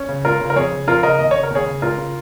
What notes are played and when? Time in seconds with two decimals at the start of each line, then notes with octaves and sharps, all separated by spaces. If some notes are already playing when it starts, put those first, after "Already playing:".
Already playing: C#4
0.09 C#3
0.25 C#2 F4 A#4
0.41 C#3
0.50 A#4
0.56 F2 G#4 C#5
0.72 C#3
0.88 F2 F4 A#4
1.03 C#3 A#4 D#5
1.19 D#2 D#5
1.31 C#3 C#5
1.43 A#4
1.50 D#2 G#4 C#5
1.66 C#3
1.82 C#2 F4 A#4
1.98 C#3